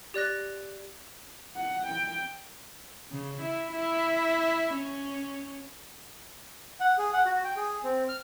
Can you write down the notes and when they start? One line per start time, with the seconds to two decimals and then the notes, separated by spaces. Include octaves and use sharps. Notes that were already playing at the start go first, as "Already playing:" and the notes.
0.14 G4 D5 F#6 A#6
1.56 F#5
1.86 G5
3.11 C#3
3.41 E4
3.72 E4
4.74 C#4
6.80 F#5
6.98 G#4
7.13 F#5
7.25 F#4
7.44 G5
7.57 G#4
7.84 C4
8.09 F6